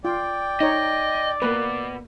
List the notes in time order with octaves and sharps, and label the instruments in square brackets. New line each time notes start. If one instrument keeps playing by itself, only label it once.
[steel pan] F4 [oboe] D5 [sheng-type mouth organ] G5
[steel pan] D#4 C#5 [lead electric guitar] D#5
[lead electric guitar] B2 [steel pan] A#3 B4